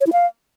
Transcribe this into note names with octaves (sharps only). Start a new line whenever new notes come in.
C#5
E4
F5